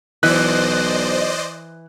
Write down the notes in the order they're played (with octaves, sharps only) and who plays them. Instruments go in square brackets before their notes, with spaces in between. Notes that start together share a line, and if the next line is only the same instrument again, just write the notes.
[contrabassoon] B1 [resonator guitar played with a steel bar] E3 [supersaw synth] C5 D5 D#5 [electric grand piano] F#6